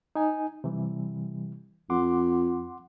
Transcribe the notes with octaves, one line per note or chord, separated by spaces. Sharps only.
D#4 G#5
C3 E3 G3
F2 F#5 C6 D6